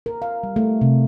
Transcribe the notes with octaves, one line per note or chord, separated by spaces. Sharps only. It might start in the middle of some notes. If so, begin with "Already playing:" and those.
A#4
F5
G3
A3
C3